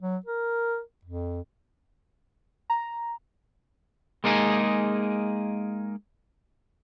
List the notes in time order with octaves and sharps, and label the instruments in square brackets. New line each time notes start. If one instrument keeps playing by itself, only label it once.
[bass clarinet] F#3
A#4
F2
[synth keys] A#5
[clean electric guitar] G#3 A#3 D#4 G#4